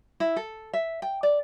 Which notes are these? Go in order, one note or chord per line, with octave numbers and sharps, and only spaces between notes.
E4
A4
E5
G5
D5